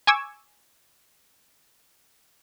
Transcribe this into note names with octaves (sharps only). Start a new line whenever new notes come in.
G#5 C#6 D6 E6 G#6